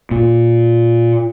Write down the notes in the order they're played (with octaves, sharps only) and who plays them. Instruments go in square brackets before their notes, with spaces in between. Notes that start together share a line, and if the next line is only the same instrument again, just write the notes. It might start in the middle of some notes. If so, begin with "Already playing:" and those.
[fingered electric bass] A#2